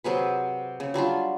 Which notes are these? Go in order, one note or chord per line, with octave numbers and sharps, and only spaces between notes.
C3 F#3 G#4 B4
C#3
F#3 G3 D4 F4